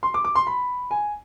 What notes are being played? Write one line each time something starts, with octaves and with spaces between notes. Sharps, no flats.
C6
D6
D6
C6
B5
G#5